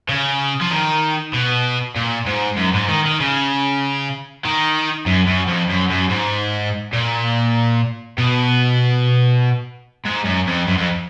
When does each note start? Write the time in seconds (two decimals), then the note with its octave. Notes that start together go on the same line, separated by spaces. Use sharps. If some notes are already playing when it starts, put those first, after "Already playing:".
0.09 C#3
0.61 F3
0.70 D#3
1.33 B2
1.96 A#2
2.26 G#2
2.57 F#2
2.73 G#2
2.88 D#3
3.05 D#3
3.20 C#3
4.45 D#3
5.06 F#2
5.27 F#2
5.48 F2
5.69 F#2
5.90 F#2
6.10 G#2
6.93 A#2
8.18 B2
10.06 G#2
10.25 F#2
10.47 F2
10.67 F#2
10.77 F2